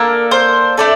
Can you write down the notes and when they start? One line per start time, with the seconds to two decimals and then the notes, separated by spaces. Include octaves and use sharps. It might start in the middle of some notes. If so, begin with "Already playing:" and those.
Already playing: A#3 D4 A4 A#4
0.31 C5
0.77 A3 D4 A4 D5